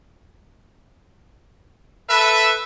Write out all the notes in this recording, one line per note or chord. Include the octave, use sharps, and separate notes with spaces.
A4 B4 E5